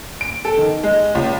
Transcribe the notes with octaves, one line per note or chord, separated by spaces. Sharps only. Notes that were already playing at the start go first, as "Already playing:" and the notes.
D7
A4
D#3
G#3
C#2